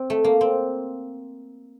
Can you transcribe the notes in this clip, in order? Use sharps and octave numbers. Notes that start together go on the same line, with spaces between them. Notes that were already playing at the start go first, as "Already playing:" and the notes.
Already playing: C4
A3
A#3
C4